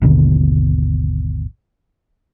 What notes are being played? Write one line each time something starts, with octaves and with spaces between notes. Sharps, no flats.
G#1 D#2 B2 D3